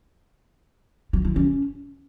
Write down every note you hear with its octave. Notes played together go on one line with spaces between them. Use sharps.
F4
E4
C#4